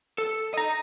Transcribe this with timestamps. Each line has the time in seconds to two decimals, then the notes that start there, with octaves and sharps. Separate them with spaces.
0.18 A4
0.54 D#5 A#5